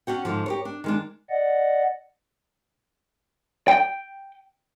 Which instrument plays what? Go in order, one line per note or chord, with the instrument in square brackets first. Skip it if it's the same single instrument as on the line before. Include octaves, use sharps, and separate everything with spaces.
[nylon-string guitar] C#4 D4 F#4 G5
G#2 D3 F3
G4 A#4 C#5
D4
D#3 G#3 D4
[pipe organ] D5 D#5 F#5
[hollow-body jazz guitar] G5